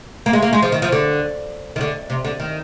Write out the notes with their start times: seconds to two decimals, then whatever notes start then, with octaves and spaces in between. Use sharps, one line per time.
0.26 A#3
0.33 G#3
0.42 A#3
0.53 G#3
0.62 F3
0.72 D#3
0.82 F3
0.92 D3
1.76 D#3
1.81 D3
2.10 C3
2.25 D3
2.40 D#3